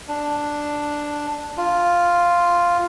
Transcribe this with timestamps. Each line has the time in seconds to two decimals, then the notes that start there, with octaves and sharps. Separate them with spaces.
0.08 D4
1.57 F4